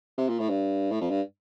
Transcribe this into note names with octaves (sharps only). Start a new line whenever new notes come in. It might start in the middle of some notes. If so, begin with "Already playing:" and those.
C3
A#2
A2
G2
A2
F2
G2